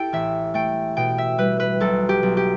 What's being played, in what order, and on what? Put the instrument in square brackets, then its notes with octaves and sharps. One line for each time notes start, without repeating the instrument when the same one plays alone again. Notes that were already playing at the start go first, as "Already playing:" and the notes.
Already playing: [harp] E4 G4 A4 G5
A1 E5
A3 G5
B2 G5
E5
G3 B4
B4
B1 A4
G4
B1
G4